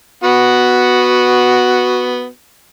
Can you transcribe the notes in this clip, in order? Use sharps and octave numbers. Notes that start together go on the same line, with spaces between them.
B3 F#4